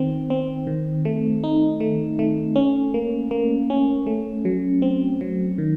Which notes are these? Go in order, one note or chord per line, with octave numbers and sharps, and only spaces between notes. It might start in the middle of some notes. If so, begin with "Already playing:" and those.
Already playing: D#3 C4
C4
D#3
A3
D#4
A3
A3
C#4
A#3
A#3
C#4
A3
F#3
C4
F#3
D#3